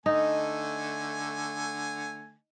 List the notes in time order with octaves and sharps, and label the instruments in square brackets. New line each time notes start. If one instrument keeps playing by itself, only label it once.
[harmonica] D3 A3 G#5 [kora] D#4